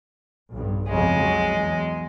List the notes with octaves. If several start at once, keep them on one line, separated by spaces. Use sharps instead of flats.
B1 G2
B1 F2 C#3 G#3
F#3
E2